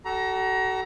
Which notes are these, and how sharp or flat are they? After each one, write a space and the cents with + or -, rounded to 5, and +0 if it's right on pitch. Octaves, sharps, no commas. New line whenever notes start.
F#4 +40 A4 -5 A#5 +20